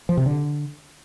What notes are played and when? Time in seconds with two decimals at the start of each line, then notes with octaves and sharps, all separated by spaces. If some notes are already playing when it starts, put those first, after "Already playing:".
0.09 F3
0.17 C3
0.26 D3